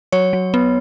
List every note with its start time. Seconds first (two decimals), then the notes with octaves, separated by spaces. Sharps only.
0.12 F#3 C#5
0.33 F#3
0.54 B3